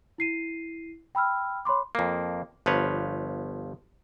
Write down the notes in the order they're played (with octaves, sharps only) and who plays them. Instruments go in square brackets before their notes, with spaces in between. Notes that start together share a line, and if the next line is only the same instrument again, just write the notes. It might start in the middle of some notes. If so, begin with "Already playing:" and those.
[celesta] E4 C7 D#7
G5 B5 E6 F6
C#5 B5 C6 D6
[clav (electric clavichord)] F2 A#3
G1 F3 B4 C#5